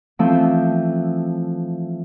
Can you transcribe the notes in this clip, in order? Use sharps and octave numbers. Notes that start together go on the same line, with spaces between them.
E3 F3 A3 C4